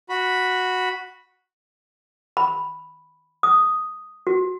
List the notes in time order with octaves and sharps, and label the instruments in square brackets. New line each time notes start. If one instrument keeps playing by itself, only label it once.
[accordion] F#4 B5
[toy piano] B5
D#6
F#4